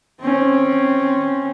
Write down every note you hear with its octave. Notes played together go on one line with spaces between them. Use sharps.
C4 C#4